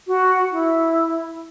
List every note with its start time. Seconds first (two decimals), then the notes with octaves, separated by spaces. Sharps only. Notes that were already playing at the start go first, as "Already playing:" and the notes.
0.07 F#4
0.52 E4